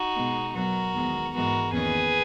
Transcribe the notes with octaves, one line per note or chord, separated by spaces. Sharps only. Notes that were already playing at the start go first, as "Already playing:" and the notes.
Already playing: D#4 F#4
B2 G#3 B3
B2 F#3 B3 F#4 A#4
E2 D#3 G#3 B3
G#2 E3 G#3 B3 F#4 A#4
E2 D#3 A#3 C#4 G#4 B4